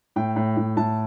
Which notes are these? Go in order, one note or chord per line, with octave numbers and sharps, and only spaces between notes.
A2 G5
A2
A2
A2 A5